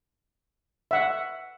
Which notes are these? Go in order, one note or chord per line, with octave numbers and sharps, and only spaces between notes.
E5 F#5